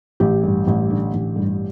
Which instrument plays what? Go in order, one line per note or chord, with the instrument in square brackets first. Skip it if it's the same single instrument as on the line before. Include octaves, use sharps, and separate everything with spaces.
[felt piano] A1 G4
G2
A1
D3
A1
G2